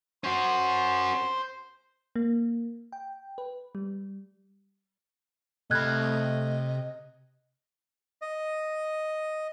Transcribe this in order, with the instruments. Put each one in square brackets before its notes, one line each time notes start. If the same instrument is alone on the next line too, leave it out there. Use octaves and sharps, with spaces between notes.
[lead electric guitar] C#4 F#4 [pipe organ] C5
[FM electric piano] A#3
G5
B4
G3
[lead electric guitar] C3 B5 [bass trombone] A3 [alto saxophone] D#5 [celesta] F6 F#6 G#6
[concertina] D#5